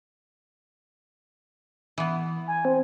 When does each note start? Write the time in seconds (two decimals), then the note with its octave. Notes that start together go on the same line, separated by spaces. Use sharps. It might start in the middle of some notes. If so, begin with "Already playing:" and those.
1.98 E3 B3
2.47 G#5
2.65 C4